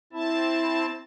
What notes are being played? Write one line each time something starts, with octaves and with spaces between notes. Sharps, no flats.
C4 E4 A5